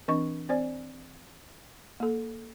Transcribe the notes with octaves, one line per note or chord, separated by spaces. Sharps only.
E3 C4 D4 D#5 C#6
C4 C5 D5 G#5
A#3 A4